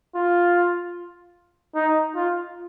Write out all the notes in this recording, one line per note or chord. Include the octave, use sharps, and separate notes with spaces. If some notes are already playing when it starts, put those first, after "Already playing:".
F4
D#4
F4